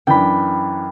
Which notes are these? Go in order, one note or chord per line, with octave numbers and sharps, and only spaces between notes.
F#2 E3 D4 G5 B5